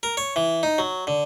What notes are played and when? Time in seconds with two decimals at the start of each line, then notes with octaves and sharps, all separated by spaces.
0.03 A#4
0.17 C#5
0.36 E3
0.63 D#4
0.78 F#3
1.07 D3